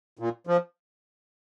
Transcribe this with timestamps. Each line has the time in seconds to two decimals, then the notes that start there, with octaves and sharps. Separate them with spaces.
0.19 A#2
0.47 F3